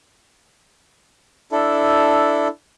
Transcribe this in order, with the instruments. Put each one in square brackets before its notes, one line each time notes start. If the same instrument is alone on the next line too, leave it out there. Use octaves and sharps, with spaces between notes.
[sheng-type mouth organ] D4 E4 A4